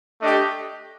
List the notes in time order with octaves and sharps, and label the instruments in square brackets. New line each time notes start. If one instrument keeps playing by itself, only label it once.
[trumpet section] A3 D4 G4 D#5